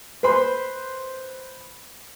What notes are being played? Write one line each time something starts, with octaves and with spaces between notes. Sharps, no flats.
B4 C5 B5 C6